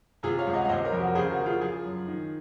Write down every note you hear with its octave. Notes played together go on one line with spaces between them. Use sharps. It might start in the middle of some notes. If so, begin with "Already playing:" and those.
C3 F4 G#4
C#5 F5
C#2
D#5 F#5
F5
C3 C5 D#5
A#4 C#5
F2
F#4 A#4
C#3 G#4 C5
F#4 A#4
C#3
F4 G#4
F3 F4 G#4
F#2
D#3